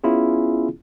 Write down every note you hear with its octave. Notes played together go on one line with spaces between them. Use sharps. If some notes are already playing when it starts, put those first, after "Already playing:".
B3 C#4 E4 F4 G#4